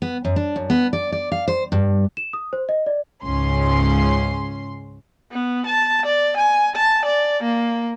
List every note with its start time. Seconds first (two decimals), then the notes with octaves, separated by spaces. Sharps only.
0.02 B3
0.25 F#2
0.36 D4
0.56 F#2
0.70 B3
0.93 D5
1.12 D5
1.32 F5
1.48 C5
1.72 G2
2.17 E7
2.33 D#6
2.53 C5
2.69 D#5
2.86 D5
3.23 C#2 G#2 C#4 C6
5.32 B3
5.67 A5
6.06 D5
6.37 G#5
6.76 A5
7.05 D5
7.43 A#3